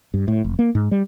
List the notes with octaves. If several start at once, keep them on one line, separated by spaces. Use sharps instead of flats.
G2
A2
F1
A#3
G#2
G3